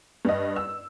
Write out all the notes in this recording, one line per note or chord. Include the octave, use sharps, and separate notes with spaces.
G2 D#5
E6